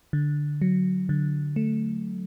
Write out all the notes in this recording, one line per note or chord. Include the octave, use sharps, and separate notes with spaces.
D3
F#3
D3
A3